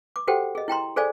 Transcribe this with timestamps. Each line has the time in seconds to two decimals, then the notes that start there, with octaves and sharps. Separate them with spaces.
0.16 D6
0.27 F#4 G4 A4 C5 F#5 G5
0.55 G#4 D#5
0.68 E4 G5 A#5 C6
0.96 G#4 A4 C5 D5 F5 G#5